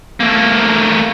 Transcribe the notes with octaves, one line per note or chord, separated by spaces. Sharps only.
A3 A#3